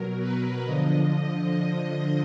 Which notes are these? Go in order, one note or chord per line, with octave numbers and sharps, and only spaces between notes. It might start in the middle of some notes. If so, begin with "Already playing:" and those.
Already playing: B2 F#3 A#4
B4
D3 F3 D#5